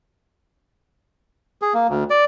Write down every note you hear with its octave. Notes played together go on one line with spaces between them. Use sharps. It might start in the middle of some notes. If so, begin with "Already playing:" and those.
G#4
A#3
D2
D5